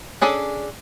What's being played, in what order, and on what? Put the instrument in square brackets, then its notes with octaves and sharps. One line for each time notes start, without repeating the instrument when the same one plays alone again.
[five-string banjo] C#4 D4 G#4 A4